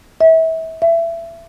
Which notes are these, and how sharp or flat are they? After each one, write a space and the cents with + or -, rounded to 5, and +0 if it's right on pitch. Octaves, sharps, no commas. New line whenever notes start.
E5 -30
E5 +25